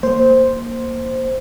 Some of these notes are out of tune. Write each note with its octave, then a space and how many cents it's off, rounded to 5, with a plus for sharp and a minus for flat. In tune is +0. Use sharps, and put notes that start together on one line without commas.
A#3 +0 C5 +0